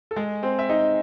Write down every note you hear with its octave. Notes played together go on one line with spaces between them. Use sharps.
A4
G#3 G#4
C4 C5
E5
D#4 D#5